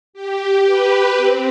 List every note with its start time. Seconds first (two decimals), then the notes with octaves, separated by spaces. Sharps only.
0.13 G4
0.65 B4
1.17 C4